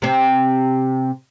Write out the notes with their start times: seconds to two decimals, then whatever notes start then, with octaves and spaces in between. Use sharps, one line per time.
0.02 C3 C4